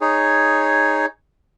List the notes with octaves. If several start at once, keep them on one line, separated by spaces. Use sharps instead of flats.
D#4 G#4 C#5